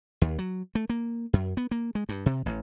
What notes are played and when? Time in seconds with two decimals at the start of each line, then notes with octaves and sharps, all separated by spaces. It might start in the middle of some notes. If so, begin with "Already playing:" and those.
0.21 D#2
0.39 F#3
0.75 A3
0.90 A#3
1.33 F#2
1.57 B3
1.71 A#3
1.95 G#3
2.09 G2
2.26 C3
2.46 A1